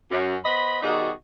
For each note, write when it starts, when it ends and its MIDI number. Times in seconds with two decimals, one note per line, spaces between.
0.11 0.36 42
0.45 0.79 59
0.45 0.79 72
0.45 0.79 75
0.45 0.79 83
0.82 1.11 47
0.82 1.11 51
0.82 1.11 55
0.82 1.11 63
0.82 1.11 66
0.82 1.11 68